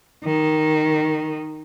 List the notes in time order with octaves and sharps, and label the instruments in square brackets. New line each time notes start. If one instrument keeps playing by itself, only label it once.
[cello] D#3